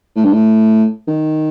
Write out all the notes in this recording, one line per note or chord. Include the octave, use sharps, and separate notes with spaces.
A2
G2
A2
D#3